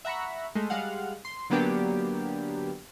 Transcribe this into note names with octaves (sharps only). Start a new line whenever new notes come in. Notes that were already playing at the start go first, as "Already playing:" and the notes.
E5 F#5 A#5 B5 C#6
G#3 A3
G3 G#3 F5 F#5
C6
D3 F#3 A#3 B3 D4 G4